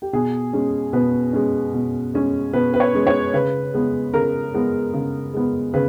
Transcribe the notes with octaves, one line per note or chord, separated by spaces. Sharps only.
G4
B2 G#4
G#3 C#4
B2 B4
G#3 C#4
B2
G#3 C#4
B2 B4
B4
C#5
G#3 C#4
C#5
C#3 B4
G#3 B3
C#3 A#4
G#3 B3
C#3
G#3 B3
C#3 B4